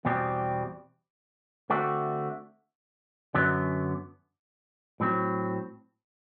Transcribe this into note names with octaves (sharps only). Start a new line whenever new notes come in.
E2 B2 G3 C4 G4
D3 A3 C4 F#4
F#2 D3 F#3 B3
A2 F#3 C4